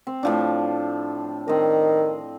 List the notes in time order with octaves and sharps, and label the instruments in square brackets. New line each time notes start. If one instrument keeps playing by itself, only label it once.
[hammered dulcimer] C4
A2 F3 D4
[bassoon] D#3 [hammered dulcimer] C4 D#5